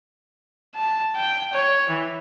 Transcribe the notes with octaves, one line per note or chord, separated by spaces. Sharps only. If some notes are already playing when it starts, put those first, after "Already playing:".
A5
G5
C#5
E3